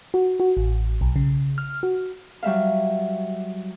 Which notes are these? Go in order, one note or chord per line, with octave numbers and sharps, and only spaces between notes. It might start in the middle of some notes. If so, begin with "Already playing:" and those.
F#4
F#4
A1
B1
C#3
F6
F#4
F#3 G3 E5 F5